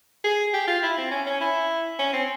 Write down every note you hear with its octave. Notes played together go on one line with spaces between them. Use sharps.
G#4
G4
F4
E4
C4
C#4
C#4
E4
C#4
C4